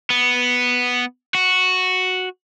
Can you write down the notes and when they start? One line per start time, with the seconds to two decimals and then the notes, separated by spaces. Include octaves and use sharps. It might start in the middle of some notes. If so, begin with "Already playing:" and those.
0.10 B3
1.35 F#4